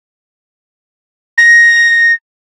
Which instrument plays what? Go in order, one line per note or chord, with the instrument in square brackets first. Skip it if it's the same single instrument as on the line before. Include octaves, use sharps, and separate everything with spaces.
[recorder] A#6